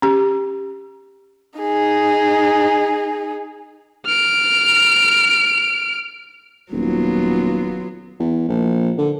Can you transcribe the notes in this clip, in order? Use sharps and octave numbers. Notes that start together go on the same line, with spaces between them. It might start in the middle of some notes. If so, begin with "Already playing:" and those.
C#4 G4
D#4 G#4
F6 D7
D#1 F#3 B3 F4
E2
A#1
D3